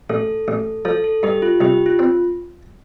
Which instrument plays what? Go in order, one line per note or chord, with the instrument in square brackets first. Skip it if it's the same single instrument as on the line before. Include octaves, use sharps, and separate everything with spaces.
[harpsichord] A1 [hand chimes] A4
[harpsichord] A1
[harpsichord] F3 [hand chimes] A4
[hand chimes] A4
[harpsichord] G2 [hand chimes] G4
[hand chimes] F4
[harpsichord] C2 [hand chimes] G4
[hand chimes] F4
[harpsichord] C4